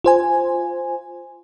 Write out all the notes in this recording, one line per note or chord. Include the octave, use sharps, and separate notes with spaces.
F4 C5 G#5